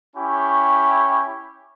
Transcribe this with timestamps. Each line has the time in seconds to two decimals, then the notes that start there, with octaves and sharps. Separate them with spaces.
0.16 C#4 E4 G4 C#6